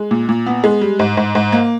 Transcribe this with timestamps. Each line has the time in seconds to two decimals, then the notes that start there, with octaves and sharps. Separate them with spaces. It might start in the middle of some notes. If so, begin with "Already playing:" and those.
Already playing: G#3
0.11 A#2
0.29 A#2
0.46 B3
0.64 G#3
0.82 G3
0.99 G#2
1.17 G#2
1.35 G#2
1.52 A#3